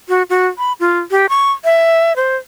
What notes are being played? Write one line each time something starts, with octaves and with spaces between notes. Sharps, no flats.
F#4
F#4
B5
F4
G4
C#6
E5
C5